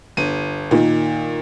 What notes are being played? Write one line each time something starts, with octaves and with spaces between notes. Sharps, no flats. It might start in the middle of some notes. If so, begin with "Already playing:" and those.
G1 D#7
A#2 D#3